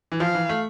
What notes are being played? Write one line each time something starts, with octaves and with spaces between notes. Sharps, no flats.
E3
F3 F5
E3
A3